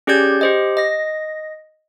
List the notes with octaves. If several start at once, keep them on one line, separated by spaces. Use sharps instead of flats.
C#4 G4 G#4 D5 G6 G#6
G4 C5 D#5
D#5 A#6